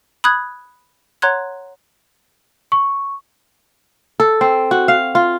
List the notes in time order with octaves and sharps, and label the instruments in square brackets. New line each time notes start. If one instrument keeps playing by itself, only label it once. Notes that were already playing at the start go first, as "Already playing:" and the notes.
[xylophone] B5 D#6 F#6 G#6
C#5 F#5 A#5 C6 F#6 G#6
[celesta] C#6
[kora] A4
C4
F#4
F5
F4